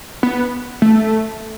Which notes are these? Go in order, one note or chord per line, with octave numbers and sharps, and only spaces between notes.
B3
A3